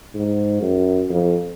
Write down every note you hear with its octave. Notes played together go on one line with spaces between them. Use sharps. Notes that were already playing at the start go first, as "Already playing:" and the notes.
G#2
F#2
F2